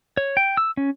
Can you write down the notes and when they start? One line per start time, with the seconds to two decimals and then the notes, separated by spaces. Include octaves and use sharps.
0.17 C#5
0.37 G5
0.57 E6
0.77 C#4